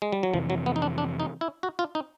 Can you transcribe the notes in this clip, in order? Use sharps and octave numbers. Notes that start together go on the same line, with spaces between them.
G#3
G3
F#3
F2 C3 E3 F3
F#3
B3
D#4
D4
D4
D#4
E4
F#4
F4
D#4